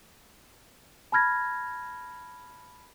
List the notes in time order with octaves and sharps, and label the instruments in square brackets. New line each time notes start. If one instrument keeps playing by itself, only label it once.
[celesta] A5 B5 F6 G#6 A#6